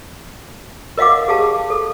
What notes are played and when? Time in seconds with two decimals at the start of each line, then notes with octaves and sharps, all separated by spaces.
0.97 A#4 D#5 F5 F#5 D6
1.28 G4 G#4 F5 A5
1.70 A4